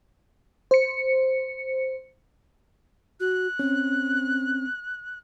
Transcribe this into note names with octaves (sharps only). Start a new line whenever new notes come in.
C5 C#7
F#4 F#6
C4 C#4